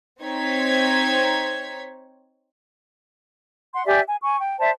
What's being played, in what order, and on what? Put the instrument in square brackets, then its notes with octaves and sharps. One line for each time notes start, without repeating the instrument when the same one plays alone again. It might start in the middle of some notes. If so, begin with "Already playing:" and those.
[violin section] C4 D#4 C5 C#5 G#6 B6
[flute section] F#5 C6
G4 D5 E5 G#5
G#5
G#5 C#6
G5
C5 D5 E5 A5